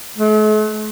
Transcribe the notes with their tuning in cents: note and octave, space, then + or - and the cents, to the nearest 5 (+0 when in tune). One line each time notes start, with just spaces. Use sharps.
A3 -45